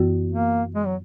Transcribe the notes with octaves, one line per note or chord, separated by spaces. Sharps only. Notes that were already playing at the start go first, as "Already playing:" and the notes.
Already playing: F#2 E3 B3 F#4
A#3
G#3
F#3